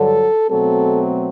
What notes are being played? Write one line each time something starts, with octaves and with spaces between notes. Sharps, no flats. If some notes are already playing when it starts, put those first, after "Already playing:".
Already playing: G2 D3 F#3 A4
B2 F#3 A3 C4 A4